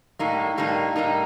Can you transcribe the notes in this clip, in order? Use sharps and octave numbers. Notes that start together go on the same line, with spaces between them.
A2 G3 A#3 D#4
A2 G3 A#3 D#4
A2 G3 A#3 D#4